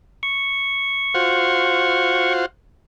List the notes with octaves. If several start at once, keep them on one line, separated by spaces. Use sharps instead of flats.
C#6
F4 F#4 C5